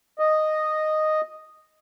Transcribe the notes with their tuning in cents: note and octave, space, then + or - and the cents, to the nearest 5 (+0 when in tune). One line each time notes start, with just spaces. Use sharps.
D#5 -5